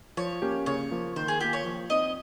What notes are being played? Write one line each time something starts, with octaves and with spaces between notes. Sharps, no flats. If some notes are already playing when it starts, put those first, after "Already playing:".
F3 C#5
A#3 C#4 G4
C#3 C#5
F3 A#3
D#3 C5
G#4
A#3 F4 G4
C#5
F3
C4 D#4 D#5